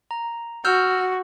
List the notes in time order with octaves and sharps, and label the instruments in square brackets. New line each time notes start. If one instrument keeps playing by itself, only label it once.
[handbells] A#5
[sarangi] F#4 [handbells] E6 F6 G6